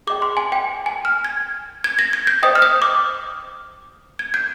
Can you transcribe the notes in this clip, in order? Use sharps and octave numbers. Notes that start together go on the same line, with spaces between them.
G#4 D#5 G5 D6
C6
G#5
G5
G#5
F6
G#6
G#6
A#6
G#6
G6
C5 D#5 G5 D#6
F6
D#6
D6
G#6
G6